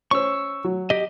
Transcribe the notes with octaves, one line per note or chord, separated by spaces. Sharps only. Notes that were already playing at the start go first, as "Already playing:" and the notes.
C#4 C5 C#6 E6
F#3
G4 D#5